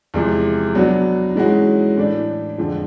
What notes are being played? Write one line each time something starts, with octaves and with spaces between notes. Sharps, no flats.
E2 C3 F3 G#3
F#3 B3 D4 F#4
G#2 E3 G#3 C#4 F#4
A2 E3 A3 D4
F2 D3 F3 G#3